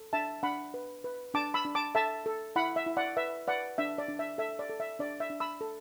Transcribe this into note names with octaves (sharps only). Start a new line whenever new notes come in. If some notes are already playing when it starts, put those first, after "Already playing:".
Already playing: A4
D4 E5 A5
D4 F#5 B5
B4
B4
D4 A5 D6
B5 E6
D4
A5 D6
A4 E5 A5
A4
E4 F#5 B5
E5
E4
D5 F#5
B4 E5
B4 D5 F#5
D4 E5
D5
D4
E5
A4 E5
D5
A4
E5
D4 D5
E5
D4
B5 E6
A4